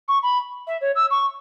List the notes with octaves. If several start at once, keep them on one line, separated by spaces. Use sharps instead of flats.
C#6
B5
E5
C#5
E6
C#6